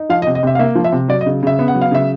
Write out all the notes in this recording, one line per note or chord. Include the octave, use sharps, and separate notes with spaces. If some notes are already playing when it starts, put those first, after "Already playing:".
Already playing: D#4
F3 F5
D#5
C3
D#5
C3 E5
F5
A#3 E5
F3
E5
C3
F#3 D5
D#5
C#3
C#3 E5
B3
F#5
F#3
F5
C#3 E5